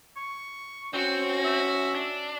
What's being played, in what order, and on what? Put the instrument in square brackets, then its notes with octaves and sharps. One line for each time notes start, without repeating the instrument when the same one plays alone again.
[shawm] C#6
[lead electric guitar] C4 [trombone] C#4 [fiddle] F#4
[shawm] E5
[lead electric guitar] D4